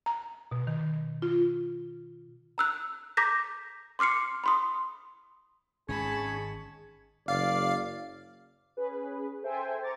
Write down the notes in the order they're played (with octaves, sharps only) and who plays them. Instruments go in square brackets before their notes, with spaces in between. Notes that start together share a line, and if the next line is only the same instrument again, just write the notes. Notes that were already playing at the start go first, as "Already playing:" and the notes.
[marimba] A#5
B2
D#3
F4
[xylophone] A#5 E6 F#6
A#5 D6 G6 A#6 B6
C6 D6 F6 C7 C#7
B5 C6 D#6
[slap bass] G#1 D#3 G#3 [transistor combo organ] C#4 [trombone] G#4 [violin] A5 B5
[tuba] F#1 [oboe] D5 [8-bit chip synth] F5
[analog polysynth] C#4 G#4 B4
A4 C5 E5 G5 G#5
C5 A#5 C#6 D6 A6